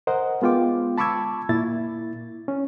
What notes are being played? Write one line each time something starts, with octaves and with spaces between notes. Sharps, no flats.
A#4 C5 D#5 F#5
G#3 B3 F4 G5 D6
A5 B5 C#6 D6 E6 G#6
A#2 A#3 E4 A6
C#4